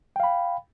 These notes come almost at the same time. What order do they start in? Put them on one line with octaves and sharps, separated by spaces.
G5 F5 B5